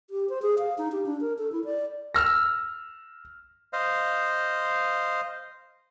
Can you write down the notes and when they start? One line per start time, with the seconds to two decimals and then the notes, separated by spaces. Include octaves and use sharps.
0.10 G4
0.29 C5
0.42 G#4
0.59 F5
0.78 D#4
0.92 G4
1.06 D4
1.21 A#4
1.38 A4
1.52 E4
1.64 D5
2.14 E6 F6 A#6
3.73 C5 D#5 F5